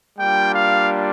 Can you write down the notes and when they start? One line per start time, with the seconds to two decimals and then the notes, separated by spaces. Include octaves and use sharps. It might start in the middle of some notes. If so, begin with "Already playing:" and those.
0.19 G3 A#3 D4 F4 G5
0.52 F5